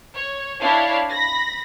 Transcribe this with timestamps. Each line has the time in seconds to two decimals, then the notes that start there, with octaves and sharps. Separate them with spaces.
0.14 C#5
0.60 D4 E4 C#5 F5
1.09 B5 A#6